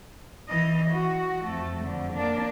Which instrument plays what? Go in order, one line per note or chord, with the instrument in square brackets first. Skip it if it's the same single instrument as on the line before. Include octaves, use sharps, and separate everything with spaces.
[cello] E3 D#5
F#4
F2 A3
F2 D3
A#3 D4